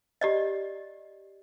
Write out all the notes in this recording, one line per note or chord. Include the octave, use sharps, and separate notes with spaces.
G4 D5 D#5